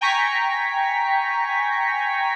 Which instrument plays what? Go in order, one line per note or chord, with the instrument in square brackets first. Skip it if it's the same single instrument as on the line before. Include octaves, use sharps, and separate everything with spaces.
[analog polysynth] G5 G#5 A#5 C#6 B6